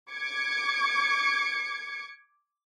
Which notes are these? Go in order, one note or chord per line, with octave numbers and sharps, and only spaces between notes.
D6 G#6 C#7